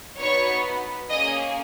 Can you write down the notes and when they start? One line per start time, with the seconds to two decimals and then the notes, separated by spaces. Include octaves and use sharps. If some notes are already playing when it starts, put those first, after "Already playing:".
0.19 B3 D#4 F#4 C#5 C#6
1.10 A#3 C#4 G#4 D#5 D#6